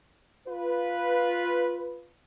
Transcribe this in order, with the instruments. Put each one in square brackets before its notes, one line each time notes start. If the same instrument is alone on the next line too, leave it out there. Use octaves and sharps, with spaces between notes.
[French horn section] F4 B4